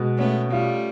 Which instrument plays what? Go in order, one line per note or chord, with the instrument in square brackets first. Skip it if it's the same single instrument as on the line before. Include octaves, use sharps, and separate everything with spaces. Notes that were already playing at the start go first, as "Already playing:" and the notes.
Already playing: [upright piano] B2 G#3
[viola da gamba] A3 B3 [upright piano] C#4
[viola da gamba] G3 A3 [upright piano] F4